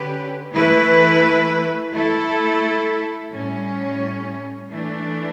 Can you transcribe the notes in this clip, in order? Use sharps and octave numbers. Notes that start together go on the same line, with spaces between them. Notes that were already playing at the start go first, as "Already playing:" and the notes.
Already playing: D3 C#4 G4 B4
E3 A3 E4 B4
A3 E4 A4
A2 G3 C#4
E3 A3 D4